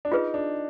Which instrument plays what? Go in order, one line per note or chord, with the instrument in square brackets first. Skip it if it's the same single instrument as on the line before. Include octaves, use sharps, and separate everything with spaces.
[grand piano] D4
[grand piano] D#4 [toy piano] F4 G#4 B4
[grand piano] D4